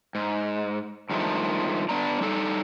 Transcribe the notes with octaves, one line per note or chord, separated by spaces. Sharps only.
G#2
G2 D#3 F3 G#3 A3
B3 D4 D5 A#5
G3 D#4 A4